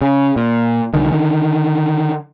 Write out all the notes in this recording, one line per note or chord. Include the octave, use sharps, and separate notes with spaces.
C#3
A#2
C2 D3 D#3
D3 D#3